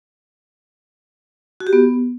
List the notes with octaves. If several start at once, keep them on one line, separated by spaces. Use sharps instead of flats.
F#4
G4
B3